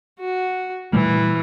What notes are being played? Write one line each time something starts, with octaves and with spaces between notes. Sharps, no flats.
F#4
A#2 E3 G3 A3